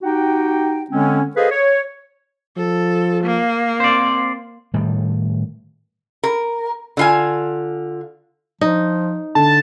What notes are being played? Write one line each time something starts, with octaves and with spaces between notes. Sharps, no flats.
D#4 F#4 G4 F#5 G5
D3 G#3 C4 C#4
G#4 A4 B4 C5 D#5 F5
C#5
F3 A4
A#3
C4 C5 D5
A2 D#3 G3
A#4
D3 F4 G#5
F3 D#4
D3 A5